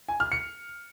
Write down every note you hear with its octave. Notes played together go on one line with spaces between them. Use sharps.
G#5
F6
C#7